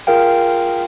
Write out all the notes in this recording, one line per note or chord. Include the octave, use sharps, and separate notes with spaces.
F4 G#4 A#4 F5 G5